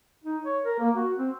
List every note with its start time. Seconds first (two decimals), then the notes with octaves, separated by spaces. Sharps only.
0.24 D#4
0.45 C#5
0.65 A#4
0.79 A#3
0.96 F#4
1.18 C4